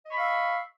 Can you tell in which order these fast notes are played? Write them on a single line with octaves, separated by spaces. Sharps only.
D#5 C#6 B5 F5 E6